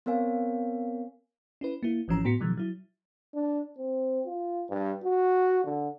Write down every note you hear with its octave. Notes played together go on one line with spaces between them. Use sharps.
B3 C4 A#4 C#5 F5 G#5
C#4 E4 B4
A#3 E4
G#1 E3 F3 C#4 A#5
A2 B3 F#4 B6 C#7
B2 D#3 F3 F#3 G#3
F#3 E4
D4
C4
F4
G2
F#4
D3